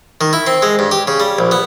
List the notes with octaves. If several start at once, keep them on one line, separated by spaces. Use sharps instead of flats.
D#3
E4
C4
G#3
G2
G4
C#3
G3
A#1
B3